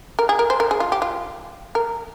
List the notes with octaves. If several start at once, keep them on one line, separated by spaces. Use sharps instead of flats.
A#4
G#4
A#4
C5
A#4
G#4
F4
G4
F4
A#4